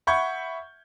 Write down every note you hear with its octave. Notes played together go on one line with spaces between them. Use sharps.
E5 F#5 B5 C#6 G6 G#6